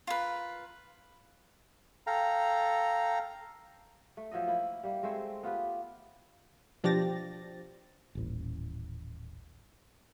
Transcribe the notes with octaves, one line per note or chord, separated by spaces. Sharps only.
F4 A#4 B4
A4 F5 G5 A#5
A3
F3 F#3 A4 D#5
A#3 E4
G3 A#3
G#3 A3 C4 C5
B3 F4 G4 B4
B2 F3 D4 G4 A6 A#6
D#1 A1